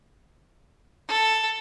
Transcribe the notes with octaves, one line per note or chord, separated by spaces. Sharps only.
A4